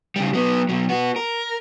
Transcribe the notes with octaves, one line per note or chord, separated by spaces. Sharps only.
C#3 G3
F#3 B3
B2 F#3
B3 F#4
A#4